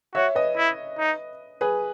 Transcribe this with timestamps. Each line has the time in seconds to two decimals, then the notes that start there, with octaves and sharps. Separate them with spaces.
0.14 F#4 C#5 E5
0.35 B4 D#5
0.57 E4
0.99 D#4
1.61 G#4 B4